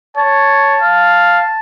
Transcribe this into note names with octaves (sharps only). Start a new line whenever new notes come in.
C#5 A5
F5